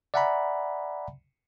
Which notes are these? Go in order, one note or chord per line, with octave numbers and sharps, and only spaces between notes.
D5 E5 F#5 G#5 A#5 B5